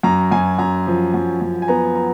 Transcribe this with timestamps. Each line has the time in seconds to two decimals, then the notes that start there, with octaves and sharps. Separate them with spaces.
0.03 F#2 A#5
0.31 F#2 G#5
0.58 F#2 A#5
0.87 F3
1.14 F#2
1.41 F#2
1.62 G#5
1.68 B3 A#5
1.96 A#5